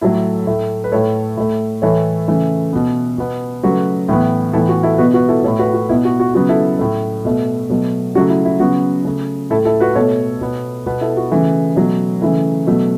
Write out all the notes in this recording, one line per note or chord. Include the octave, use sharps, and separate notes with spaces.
A2 F#3 A3 E4 A4
A2 A3
B4
A2 A3 A4 C#5
A2 A3
A2 E3 A3 A4 C#5
C#3 E3 A3
B2 B3
B2 B3
C#3 F#3 A3 F#4 B4
A2 E3 B3
A2 E3 B3 E4 A4
F#4
E4 A4
B2 B3 F#4 B4
F#4 B4
E4 A4
A2 A3 A4 C#5
F#4 B4
F#4
B2 B3 E4
F#4
F#4
C#3 F#3 B3 F#4
E4 A4
A2 A3
B2 A3
B2 F#3 A3
C#3 F#3 A3 F#4
E4
E4
C#3 F#3 B3 F#4
C#3 A3
A2 A3 E4 A4
E4 A4
F#4 B4
B2 A3 A4 C#5
B2 B3
B2 B3
E4 A4
F#4
C#3 E3 A3
B2 F#3 A3
C#3 E3 A3 E4
B2 F#3 A3